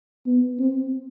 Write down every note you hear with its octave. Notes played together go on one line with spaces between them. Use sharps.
B3
C4